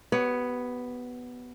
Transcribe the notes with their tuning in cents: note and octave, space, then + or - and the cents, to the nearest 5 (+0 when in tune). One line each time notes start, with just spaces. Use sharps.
B3 +0 G4 -35 C#5 +20